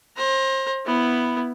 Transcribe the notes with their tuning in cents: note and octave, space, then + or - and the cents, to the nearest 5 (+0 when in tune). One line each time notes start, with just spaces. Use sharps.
C5 +30 A#5 +15
B3 +0 E4 +0